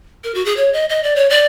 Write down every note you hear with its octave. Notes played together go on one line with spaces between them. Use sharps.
A#4
F#4
G#4
C#5
D#5
D#5
D5
C#5
D5